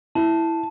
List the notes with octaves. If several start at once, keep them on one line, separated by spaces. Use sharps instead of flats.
E4 A5